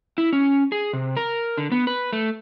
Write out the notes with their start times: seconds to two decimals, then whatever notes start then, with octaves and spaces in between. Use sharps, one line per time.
0.18 E4
0.33 C#4
0.72 G#4
0.93 C3
1.17 A#4
1.57 D3
1.72 B3
1.87 B4
2.13 A3